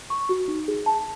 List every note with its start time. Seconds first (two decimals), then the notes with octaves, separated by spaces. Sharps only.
0.10 C#6
0.29 F#4
0.48 D#4
0.68 G#4
0.86 A5